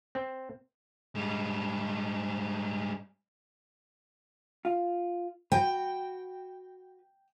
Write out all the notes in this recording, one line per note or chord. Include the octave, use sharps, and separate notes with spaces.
C4
G#2 G3
F4
F#4 B4 G5